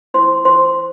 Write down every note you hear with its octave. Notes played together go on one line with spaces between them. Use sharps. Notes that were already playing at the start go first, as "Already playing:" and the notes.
E4 C5 C6
C5 C6